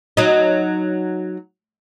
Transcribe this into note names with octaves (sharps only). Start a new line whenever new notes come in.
F#3 D#4